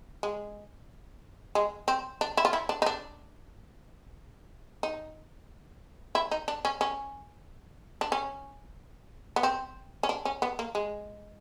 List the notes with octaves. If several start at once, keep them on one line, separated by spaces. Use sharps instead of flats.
G#3
G#3
C4
D4
E4
F4
E4
D4
D#4
D4
D#4
E4
D#4
D4
C#4
C#4
D4
C#4
B3
C4
C#4
D4
C#4
B3
A#3
G#3